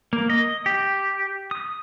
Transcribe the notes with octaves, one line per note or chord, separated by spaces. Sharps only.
A#3
D#5
G4
D#6